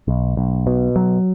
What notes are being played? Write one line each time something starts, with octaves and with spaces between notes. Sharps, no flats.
B1
B1
B2
F#3